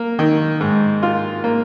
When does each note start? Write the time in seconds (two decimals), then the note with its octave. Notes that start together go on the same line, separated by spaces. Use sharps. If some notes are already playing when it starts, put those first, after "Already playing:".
Already playing: A#3
0.19 D#3
0.61 G#2
1.03 F4
1.44 A#3